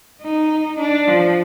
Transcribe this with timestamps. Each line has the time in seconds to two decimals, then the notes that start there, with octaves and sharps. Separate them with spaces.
0.22 D#4
0.79 D4
1.08 F3